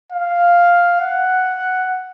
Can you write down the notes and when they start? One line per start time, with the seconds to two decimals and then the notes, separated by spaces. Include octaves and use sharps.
0.12 F5
1.01 F#5